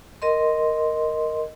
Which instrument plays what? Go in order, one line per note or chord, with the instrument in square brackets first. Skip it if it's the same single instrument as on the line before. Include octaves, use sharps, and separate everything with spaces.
[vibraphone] A#4 D#5 C6